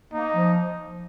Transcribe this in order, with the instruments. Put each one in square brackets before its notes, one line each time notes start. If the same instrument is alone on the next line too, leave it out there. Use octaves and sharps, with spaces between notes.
[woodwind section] A#3 [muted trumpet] D#4
[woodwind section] F3